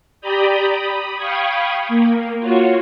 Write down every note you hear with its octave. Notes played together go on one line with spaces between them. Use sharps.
G4 D5 A#5 B5 D#6 G6
B5 D#6
F5 G5 B5 C#6 D#6 G#6
A#3
F4 F#4 C#5